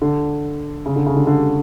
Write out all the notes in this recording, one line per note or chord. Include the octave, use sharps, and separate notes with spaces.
D3
C#3
D3
C#3
D3
D3